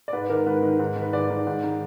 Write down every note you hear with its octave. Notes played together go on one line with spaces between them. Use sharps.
D5
G#2 B4
D#3 A#4
G#2 B4
D#3
G#2
D#3
B4
G#2 D5
D#3
G#2
D#3